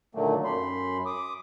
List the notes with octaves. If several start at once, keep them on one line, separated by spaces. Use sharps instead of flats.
A#2 D3 D#3 F#3 A3 A#3
F#2 B5 C6
D6 D#6